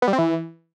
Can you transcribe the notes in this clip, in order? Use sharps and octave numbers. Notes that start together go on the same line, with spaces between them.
B3
G3
C4
E3